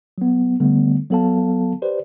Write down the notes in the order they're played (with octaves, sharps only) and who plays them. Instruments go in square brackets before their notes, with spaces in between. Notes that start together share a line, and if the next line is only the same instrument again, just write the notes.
[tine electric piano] F#3 B3
D3 G3 A3 B3
F#3 B3 A4 F5 A5
G4 B4 C5 D5